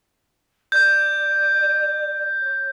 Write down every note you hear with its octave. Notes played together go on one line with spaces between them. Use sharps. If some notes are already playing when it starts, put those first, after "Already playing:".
D5 G6
C#5